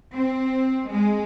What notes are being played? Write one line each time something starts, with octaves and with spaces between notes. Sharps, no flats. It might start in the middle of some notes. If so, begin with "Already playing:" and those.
C4
G#3